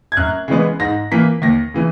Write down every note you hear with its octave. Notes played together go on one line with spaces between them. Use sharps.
G#6
F#2 F#6
C#3 E3 G#3 B3
G#2 A#6
E3 A#3 B6
D#2 A#6
C#3 E3